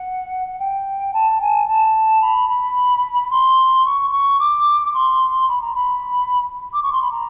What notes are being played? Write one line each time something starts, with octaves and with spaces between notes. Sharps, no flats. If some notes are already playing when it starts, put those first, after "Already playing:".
Already playing: F#5
G5
A5
G#5
A5
B5
B5
C6
C#6
C6
C#6
D6
C6
B5
A#5
B5
D6
C#6
C6
B5
A#5